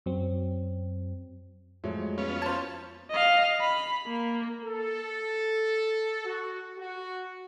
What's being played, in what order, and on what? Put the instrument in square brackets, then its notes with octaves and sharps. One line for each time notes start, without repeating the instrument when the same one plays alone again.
[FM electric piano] F#2 F#3 C4
[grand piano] F2 F#3 E4 [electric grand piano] G#3 A3 C#5
[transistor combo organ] B3 C#4 F4 [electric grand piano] C#5
[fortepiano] C5 A5
[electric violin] D#5 F5
B5
A#3
[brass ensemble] A4
F#4
F#4